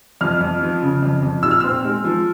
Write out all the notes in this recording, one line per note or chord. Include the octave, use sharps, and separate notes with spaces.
F2 F6
F2
F3
C#3
F2
F2
A#2 E6
F6
C4 E6
G#3
F3